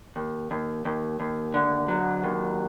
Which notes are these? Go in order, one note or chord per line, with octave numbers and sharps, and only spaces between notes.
D#2
D#2
D#2
D#2
D3
F#3
D#2